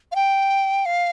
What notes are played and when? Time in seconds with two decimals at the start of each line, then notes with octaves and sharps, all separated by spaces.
0.12 F5
0.15 G5
0.86 F5